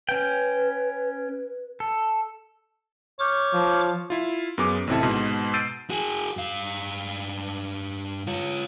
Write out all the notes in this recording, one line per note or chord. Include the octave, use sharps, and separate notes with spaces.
C#4 B4 G5
A4
C#5 D6 F6 G6
F3
E4 F4
F#2 B3 G#4 D6
A1 C3 C4 E4 A4
G#2 B2
E6 G6 A6 C7 D7 D#7
F#4 G#4
G2 F5
F4 C#5